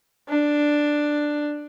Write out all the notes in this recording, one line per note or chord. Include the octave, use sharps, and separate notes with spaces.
D4